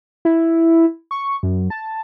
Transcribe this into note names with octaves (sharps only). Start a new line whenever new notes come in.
E4
C#6
F#2
A5